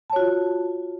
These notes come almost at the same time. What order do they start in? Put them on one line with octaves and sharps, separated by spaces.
A5 C#5 F#4 F4